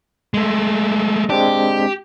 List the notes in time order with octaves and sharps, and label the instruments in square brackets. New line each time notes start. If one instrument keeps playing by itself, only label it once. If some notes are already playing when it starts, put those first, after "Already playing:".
[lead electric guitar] G#3 A3
[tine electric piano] G#3 C4 D4 [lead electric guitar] G4